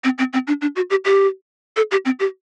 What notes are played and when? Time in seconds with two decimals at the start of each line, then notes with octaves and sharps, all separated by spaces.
0.04 C4
0.18 C4
0.33 C4
0.47 D4
0.61 D4
0.76 F#4
0.90 G4
1.05 G4
1.77 A4
1.91 G4
2.05 C4
2.20 G4